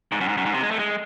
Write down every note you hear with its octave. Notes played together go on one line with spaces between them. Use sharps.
G#2
F#2
G#2
F#2
G#2
C3
G#3
A3
G#3